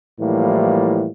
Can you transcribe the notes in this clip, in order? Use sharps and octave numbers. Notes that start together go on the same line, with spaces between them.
A2 E3 F3 G3 A#3